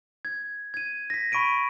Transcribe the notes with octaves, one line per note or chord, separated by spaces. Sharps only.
G#6
G#6 D#7
A#6 B6
B5 C#6 B6 D7 D#7